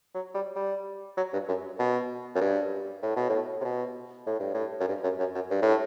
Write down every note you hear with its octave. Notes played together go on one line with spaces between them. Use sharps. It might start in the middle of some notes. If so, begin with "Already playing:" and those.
F#3
G3
G3
F#3
G2
F#2
B2
F#2
G2
A2
B2
A2
C3
B2
A2
G2
A2
F#2
G2
F#2
F#2
F#2
G2
A2